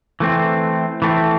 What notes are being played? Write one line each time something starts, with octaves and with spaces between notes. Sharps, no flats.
E3 A3 C4
E3 A3 C4